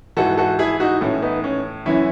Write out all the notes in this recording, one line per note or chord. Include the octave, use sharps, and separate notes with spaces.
G#2 E3 F#4 A4
F#4 A4
E4 G#4
D#4 F#4
A2 E3 C#4
B3 D#4
C#4
F#2 E3 C#4 E4